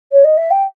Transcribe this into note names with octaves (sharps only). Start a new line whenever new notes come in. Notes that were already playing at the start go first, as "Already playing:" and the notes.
C#5
D#5
E5
G5